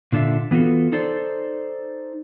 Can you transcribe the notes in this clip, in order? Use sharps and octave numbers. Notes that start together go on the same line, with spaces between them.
A#2 D3 D4 F4 E5
E3 B3 F4 F#4 A4
D#4 A4 C5 D5